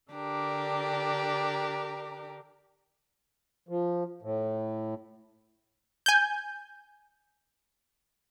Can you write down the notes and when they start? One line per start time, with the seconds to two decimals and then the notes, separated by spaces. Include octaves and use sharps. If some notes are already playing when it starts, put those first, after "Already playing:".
0.12 D3 D4 G4 A#4
3.69 F3
4.22 A2
6.06 G#5 G6